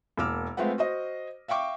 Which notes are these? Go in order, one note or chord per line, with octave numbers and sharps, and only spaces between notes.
E1 A#3 D6 E6 F6
G#3 A3 C4 F4 B4 F#5
F#4 C5 D#5
E5 F5 G5 C#6 D6